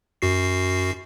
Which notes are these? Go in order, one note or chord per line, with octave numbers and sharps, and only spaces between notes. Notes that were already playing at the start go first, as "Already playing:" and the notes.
F#2 F#4 C7